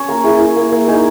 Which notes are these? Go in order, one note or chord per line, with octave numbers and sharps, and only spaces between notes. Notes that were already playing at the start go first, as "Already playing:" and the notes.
Already playing: C#4 C#5
A#3 A#4
E4 G#4
E4
A#3
A#3
D#4 G#4